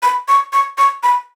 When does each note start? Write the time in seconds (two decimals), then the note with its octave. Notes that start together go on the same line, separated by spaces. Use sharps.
0.03 B5
0.28 C#6
0.53 C#6
0.78 C#6
1.03 B5